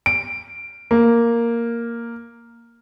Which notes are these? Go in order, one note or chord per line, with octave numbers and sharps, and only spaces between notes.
D7
A#3